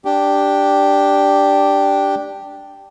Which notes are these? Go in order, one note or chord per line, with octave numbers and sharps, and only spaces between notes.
D4 G4